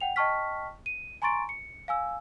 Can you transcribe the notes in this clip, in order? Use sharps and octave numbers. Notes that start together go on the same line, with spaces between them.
F#5 G5 F7
D#5 G5 A5 C#6 F6 B6
D#7
G#5 A#5 C6 C#6 A6 D7
C#7
F5 G#5 E6